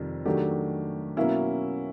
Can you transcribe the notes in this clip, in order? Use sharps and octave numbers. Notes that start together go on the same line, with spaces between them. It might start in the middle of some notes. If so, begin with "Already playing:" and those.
Already playing: F2 C3 D#3 G3
D#3 F#3 A3 D4 G4
B2 F#3 A#3 C#4 E4